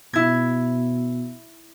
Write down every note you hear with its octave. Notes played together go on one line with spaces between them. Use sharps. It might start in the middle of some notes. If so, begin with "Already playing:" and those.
B2 E4 G#6